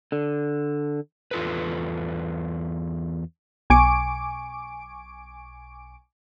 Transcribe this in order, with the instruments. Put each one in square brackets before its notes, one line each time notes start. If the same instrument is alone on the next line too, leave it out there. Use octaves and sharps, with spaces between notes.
[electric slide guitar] D3
E2 F4 A4 B4
[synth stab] B1 G#5 C#6 D6 D7